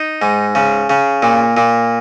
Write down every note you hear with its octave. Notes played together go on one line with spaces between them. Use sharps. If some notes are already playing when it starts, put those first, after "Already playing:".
Already playing: D#4
G#2
C#3
C#3
A#2
A#2